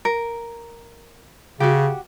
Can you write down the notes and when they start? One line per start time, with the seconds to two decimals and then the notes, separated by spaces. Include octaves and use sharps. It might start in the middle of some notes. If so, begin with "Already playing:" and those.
0.05 A#4
1.60 C#3 F#4 G4